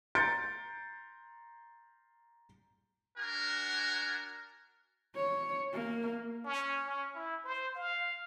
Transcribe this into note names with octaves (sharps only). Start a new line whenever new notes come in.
A#5 C6 G6 A6 C#7 D7
D4 F#4 A#4 G#5
C#5
A#3
C#4
C#4
E4
C5
F5